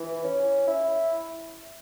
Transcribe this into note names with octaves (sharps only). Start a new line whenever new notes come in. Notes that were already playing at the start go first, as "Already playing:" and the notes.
Already playing: E3
C#4
E4